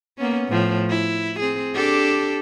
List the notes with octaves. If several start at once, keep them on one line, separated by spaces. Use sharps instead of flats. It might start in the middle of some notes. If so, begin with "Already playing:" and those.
A#3 B3 C#4
A2 F3
E4
C4 G#4
D4 G4 A4